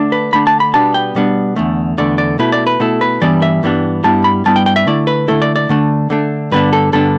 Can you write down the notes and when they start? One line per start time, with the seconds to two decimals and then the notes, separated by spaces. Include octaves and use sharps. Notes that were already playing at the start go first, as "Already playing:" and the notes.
Already playing: D3 A3 D4
0.12 B4
0.33 D3 A3 D4 B5
0.47 A5
0.60 B5
0.74 B2 G3 B3 D4 A5
0.94 G5
1.15 B2 G3 B3 D4
1.56 E2 D3 A3
1.98 E2 D3 A3 D5
2.18 D5
2.39 B2 A3 E4 B4
2.52 D5
2.67 B4
2.80 B2 A3 E4 A4
3.01 B4
3.21 G2 E3 G3 B3 D4 D5
3.42 E5
3.63 G2 E3 G3 B3 D4
4.04 G2 G3 B3 E4 A5
4.24 B5
4.45 G2 G3 B3 E4 A5
4.56 G5
4.66 G5
4.76 E5
4.87 D3 A3 E4 D5
5.07 B4
5.28 D3 A3 E4 A4
5.42 D5
5.56 D5
5.69 D3 A3 D4
6.10 D3 A3 D4
6.51 G2 D3 B3 D4 B4
6.73 A4
6.93 G2 D3 B3 D4 A4